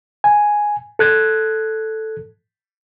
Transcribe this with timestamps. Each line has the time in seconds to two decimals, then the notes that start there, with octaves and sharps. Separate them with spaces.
0.24 G#5
0.99 A4 F#6 G#6